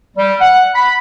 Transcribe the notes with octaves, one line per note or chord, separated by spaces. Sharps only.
G3
F#5
B5